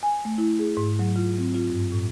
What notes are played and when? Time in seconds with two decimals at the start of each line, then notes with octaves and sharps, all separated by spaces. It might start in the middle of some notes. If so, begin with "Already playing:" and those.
0.03 G#5
0.25 A3
0.38 E4
0.59 G#4
0.77 G#2
0.99 F#3
1.16 F4
1.38 C4
1.55 F4
1.70 G2
1.92 A2